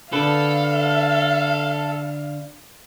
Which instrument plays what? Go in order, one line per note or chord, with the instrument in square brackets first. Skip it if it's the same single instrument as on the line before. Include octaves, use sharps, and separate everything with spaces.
[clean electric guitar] D3 B4 [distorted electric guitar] A4 [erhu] F5